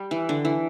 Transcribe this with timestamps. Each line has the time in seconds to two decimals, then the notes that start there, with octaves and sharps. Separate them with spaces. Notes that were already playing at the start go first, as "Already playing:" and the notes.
Already playing: G3
0.11 E3
0.29 D3
0.45 E3